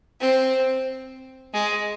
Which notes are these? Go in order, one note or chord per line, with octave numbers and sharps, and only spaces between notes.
C4
G#3